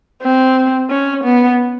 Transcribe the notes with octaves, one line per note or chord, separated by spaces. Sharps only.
C4
C#4
B3